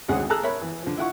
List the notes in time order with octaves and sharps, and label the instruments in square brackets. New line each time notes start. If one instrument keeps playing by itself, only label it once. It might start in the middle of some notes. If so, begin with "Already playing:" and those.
[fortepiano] G#1 D2 C#4 G#4 F#5
G#4 A4 A5 A#5 E6 F#6
A#4 C#5 E5 B5
E3
D3 F3
E4 F4 F#5 C#6